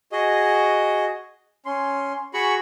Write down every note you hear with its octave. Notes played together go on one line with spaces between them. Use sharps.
F#4 G#4 D#5
C#4 C6
F#4 G#4 B5 C#6